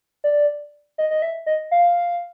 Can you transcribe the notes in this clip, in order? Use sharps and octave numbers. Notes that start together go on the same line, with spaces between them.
D5
D#5
D#5
E5
D#5
F5